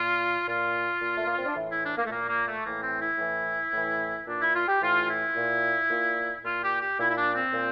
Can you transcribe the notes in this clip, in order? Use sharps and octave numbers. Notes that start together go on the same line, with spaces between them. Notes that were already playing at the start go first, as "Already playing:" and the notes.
Already playing: A#2 F4
A#2 F4
A#2
A3
A#3
C4
D4
A2 E3 E4
E4
D4
A#3
A3
A#2 A#3
A#3
A3
A2 E3 A#3
C4
E4
A2 E3
A2 E3
A#2 D4
E4
F4
G4
A2 E3 F4
E4
A#2
A#2
A#2 F4
G4
G4
A#2 E4
E4
D4
C4
A#2